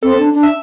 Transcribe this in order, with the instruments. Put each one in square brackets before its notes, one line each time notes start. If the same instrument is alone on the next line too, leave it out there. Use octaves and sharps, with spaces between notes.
[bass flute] C4 [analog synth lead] A4
[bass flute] D4
D4
[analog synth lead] E5